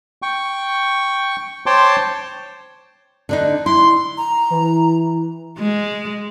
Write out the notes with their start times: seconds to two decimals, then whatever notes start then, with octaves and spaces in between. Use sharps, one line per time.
0.22 G5 C#6
1.66 C5 C#5 G5 A5 C6 D6
3.29 D3 D4 D#4
3.66 E4 C6
4.17 A#5
4.50 E3
5.59 G#3